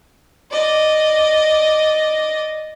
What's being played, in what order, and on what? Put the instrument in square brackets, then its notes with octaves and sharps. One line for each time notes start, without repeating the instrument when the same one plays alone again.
[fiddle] D5 D#5